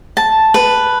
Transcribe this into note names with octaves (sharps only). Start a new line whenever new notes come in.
A5
B4